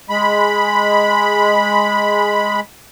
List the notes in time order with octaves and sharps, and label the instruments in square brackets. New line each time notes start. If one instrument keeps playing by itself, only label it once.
[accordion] G#3 B5